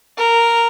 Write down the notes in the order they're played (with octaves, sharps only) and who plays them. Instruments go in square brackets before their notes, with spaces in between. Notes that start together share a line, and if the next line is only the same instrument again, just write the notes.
[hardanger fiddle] A#4